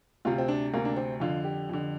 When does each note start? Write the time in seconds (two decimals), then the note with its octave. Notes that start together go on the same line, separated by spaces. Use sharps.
0.25 D2 C3 F4
0.38 C4
0.48 D4
0.73 D2 C3 A#3
0.85 D4
0.96 C4
1.20 F2 D3 F4
1.44 G4
1.69 F2 D3